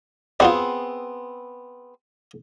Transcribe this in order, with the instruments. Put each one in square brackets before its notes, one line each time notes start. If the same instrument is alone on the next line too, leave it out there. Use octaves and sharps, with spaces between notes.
[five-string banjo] B3 C4 G#4 [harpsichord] F4 F#4 D5